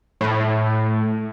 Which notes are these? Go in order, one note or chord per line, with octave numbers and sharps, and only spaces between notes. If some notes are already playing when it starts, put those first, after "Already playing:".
A2